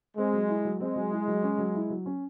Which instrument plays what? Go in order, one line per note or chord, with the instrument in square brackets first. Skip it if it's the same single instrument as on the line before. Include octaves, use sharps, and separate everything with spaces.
[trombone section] G#3 [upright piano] C4
[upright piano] F#3
E4
F#3
[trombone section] G#3 [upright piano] C4
[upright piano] F#3
E4
F#3
C#4
F#3
E4
F#3
C#4